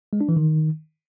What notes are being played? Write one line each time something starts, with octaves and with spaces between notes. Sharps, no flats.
G#3
D4
E3
D#3